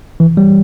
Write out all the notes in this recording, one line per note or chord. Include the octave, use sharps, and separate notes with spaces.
E3
G3